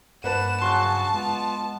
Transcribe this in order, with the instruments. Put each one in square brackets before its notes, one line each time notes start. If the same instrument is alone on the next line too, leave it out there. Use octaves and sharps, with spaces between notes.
[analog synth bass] G2 [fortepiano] A#3 B4 A5 [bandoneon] F#5 [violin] E7
[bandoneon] C#3 F#3 F#4 [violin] A5 [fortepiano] C6 F#6
[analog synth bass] G#3 [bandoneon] B3 F4